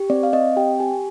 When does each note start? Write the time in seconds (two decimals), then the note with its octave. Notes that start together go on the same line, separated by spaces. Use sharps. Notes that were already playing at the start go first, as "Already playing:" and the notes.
Already playing: G4
0.10 C4 D5
0.23 F5
0.33 C4 D#5
0.57 G4 G5
0.79 G4 G#5